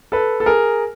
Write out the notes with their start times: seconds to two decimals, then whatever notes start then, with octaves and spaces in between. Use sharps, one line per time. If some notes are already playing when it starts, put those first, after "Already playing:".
0.12 A4 B4
0.40 A4
0.46 G#4 A#4